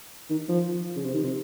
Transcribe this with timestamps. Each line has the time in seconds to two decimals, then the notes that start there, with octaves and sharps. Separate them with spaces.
0.30 D#3
0.49 F3
0.96 C#3
1.04 C3
1.14 D#3
1.24 C3